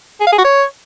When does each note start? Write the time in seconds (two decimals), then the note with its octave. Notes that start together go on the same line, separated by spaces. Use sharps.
0.21 G#4
0.27 F5
0.33 G#4
0.38 F#4
0.44 C#5